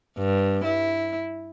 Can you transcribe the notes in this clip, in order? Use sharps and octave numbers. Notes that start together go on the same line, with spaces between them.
G2
E4